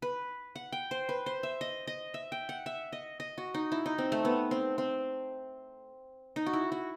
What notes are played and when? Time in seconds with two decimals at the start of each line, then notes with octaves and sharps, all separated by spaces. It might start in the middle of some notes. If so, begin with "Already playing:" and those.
0.02 B4
0.55 F#5
0.72 G5
0.91 C5
1.09 B4
1.26 C5
1.43 E5
1.61 D#5
1.87 D#5
2.14 E5
2.32 G5
2.49 F#5
2.66 E5
2.92 D#5
3.20 D#5
3.38 F#4
3.54 D#4
3.72 E4
3.86 D#4
3.98 C4
4.12 A3
4.25 B3
4.51 C4
4.78 C4
6.36 D#4
6.46 F#4
6.53 E4
6.72 F#4